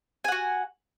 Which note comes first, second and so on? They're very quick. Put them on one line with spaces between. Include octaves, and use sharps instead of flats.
G#5 F#5 F#4